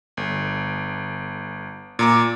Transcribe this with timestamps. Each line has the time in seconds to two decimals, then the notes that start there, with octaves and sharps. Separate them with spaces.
0.17 G1
1.99 A#2 A#5 D6